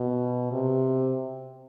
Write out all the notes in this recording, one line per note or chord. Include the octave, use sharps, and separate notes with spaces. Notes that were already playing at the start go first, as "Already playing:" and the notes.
Already playing: B2
C3